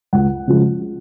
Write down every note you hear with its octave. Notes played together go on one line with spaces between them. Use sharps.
C#2 F#5
C#3 F3 G#3